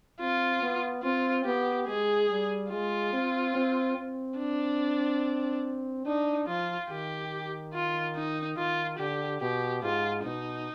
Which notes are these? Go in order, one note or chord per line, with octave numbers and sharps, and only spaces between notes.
C4 F4
B3
C4 F4
B3 G4
G#3 G#4
G3
G#3 F4
C4
C4
C4
D4
D4 D#4
F3 F4
D#3 G4
F4
D#4
D#3 F4
D3 G4
B2 G4
G#2 F4
B2 D#4